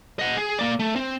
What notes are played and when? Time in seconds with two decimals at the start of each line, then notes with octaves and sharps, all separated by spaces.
0.19 D#5 F#5
0.37 G#4
0.59 A#3 D5
0.79 A3
0.96 C4